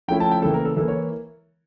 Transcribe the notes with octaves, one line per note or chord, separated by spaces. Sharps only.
F3 A3 C#4 E4 G5
A5
G5
C#3 E3 A#3 A4
A#4
A4
E3 A#3 E4 A4
C#5